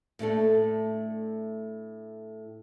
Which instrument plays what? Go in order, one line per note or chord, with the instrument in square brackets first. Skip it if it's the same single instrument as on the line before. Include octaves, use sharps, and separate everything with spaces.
[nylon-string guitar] A2 A3 D4 A4